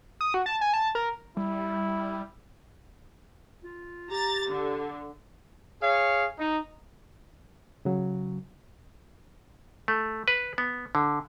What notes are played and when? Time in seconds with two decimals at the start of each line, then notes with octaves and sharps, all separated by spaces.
0.21 D#6
0.34 F#4
0.46 A5
0.61 G#5
0.74 A5
0.95 A#4
1.37 G3 E4
3.63 F4
4.11 G4 A#5 A6
4.48 D3
5.82 G#4 C#5 F5
6.38 D#4
7.85 C#3 F#3
9.88 A3
10.28 B4
10.58 B3
10.95 D3